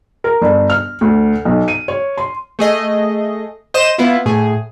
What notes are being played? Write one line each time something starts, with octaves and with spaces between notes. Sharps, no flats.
A#4
G1
F6
D2
B1
D#7
C#5
C6
A3 G#4 D#5
C5 D#5 D#6 E7
B3 E4 F4
A2 G#4